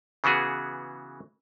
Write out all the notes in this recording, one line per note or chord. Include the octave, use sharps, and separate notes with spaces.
C#3 E3 B3 F#4 G#4